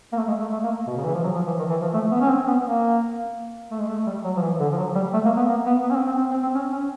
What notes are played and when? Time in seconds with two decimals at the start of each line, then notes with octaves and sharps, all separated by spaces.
0.12 A#3
0.17 A3
0.28 G#3
0.40 A3
0.52 A3
0.64 A#3
0.87 B2
0.97 C#3
1.05 E3
1.15 F3
1.23 F#3
1.35 F3
1.47 E3
1.59 D#3
1.70 E3
1.82 F3
1.94 A3
2.11 B3
2.21 C#4
2.29 C4
2.47 B3
2.65 A#3
3.71 A3
3.80 G#3
3.88 A3
4.07 G3
4.24 F#3
4.37 F3
4.42 E3
4.60 D3
4.72 F3
4.78 F#3
4.95 G3
5.14 A3
5.25 A#3
5.37 B3
5.49 A#3
5.66 B3
5.84 B3
5.91 C#4
5.96 C4
6.08 C4
6.19 C4
6.31 C4
6.43 C4
6.55 C#4
6.73 C#4